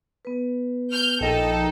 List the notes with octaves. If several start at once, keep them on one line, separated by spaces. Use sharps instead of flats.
B3 B4
F6 G6
A#1 D#4 A4 G5